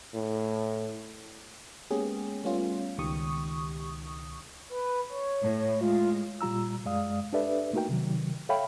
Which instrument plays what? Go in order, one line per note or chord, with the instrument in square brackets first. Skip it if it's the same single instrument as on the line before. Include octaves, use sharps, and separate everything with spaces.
[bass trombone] A2
[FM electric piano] G#3 A#3 B3 C#4 G4 G#4
G3 A3 B3 C#4 F4
C#2 B2 D#3 G4 C#6 D#6
[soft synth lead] B4
C#5
[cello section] A2
[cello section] G#3 [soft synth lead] F4
[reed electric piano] A#2 G3 F4 A#5 E6
F#2 G#3 D5 F5 D#6
D4 G4 A4 B4 D5 E5
A3 A#3 D#4 F#4 A#4 G5
C3 D#3 F#3
A4 C#5 E5 F5 G5 B5